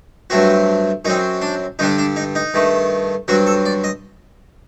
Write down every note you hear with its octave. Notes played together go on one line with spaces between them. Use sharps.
G2 F#3 A3 C4 F#4
F#2 F#3 C4 D#4
D4
G2 D3 G3 D4 D#4
D4
D#4
D#4
G2 D#3 A3
G2 F#3 C4 F#4
A4
D5
D#5